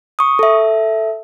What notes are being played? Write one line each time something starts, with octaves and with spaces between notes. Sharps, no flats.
C#6 D#6
A4 E5